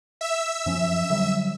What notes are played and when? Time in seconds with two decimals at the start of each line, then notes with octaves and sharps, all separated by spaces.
0.21 E5 E6
0.66 F#2 F3 C#4
1.10 D3 F#3 G3